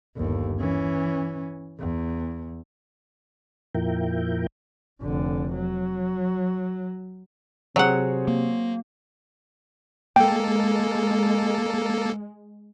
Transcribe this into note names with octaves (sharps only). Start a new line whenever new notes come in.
G1 D#2
E3 C#4
E2
F2 A#2 F3 E4 A#4 G5
F1 D3
F#3
C3 F#3 C4 G#4 C#5 F#5
A#3
G#3 A#3 A4 G5